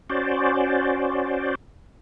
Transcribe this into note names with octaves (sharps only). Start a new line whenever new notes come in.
C#4 F#4 C5 D5